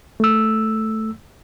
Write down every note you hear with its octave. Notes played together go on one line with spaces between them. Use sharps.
A3 E6